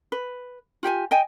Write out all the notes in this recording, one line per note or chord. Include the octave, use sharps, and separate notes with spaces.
B4
F4 G4 G5 G#5
D#5 G5 G#5